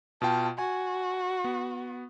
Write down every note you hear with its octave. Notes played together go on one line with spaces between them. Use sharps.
B2 F4 G5 A5
F#4 G#5
B3